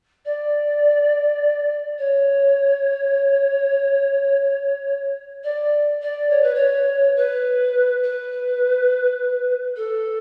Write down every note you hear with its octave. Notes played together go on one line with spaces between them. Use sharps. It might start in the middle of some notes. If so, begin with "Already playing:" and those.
D5
C#5
D5
D5
C#5
B4
C#5
B4
B4
A4